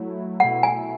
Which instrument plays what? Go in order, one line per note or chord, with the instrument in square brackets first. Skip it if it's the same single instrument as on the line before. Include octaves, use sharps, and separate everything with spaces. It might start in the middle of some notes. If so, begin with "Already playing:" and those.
Already playing: [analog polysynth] F#3 A3 E4
[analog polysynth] B2 A3 E4 [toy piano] F#5
[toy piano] G#5